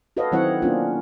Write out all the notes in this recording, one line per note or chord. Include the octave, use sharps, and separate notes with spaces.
F#4 A4 B4 C#5 D#5 F5
D#3 F#3 C4 E4 C#5 F#5
A#3 B3 C#4 D4 F4